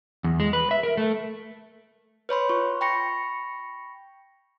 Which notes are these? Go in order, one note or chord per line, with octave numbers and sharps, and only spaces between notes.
E2
G#3
B4
E5
A#4
A3
B4 C#5 B5 C6
F4 C#6
G5 B5 C#6 A#6 C#7